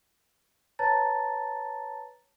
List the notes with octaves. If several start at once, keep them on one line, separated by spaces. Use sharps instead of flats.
B4 C#5 A5 A#5 A6